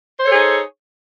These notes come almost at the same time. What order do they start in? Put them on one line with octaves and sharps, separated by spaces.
C5 C#5 A4 G#4 D#4